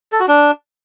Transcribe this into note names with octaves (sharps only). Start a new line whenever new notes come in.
A4
F#4
D4